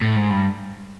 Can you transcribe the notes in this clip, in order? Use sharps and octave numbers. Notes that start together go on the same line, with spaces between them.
A2
G#2
G2